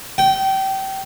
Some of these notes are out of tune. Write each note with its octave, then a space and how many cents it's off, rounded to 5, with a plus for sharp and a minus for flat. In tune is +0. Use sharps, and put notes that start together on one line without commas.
G5 -25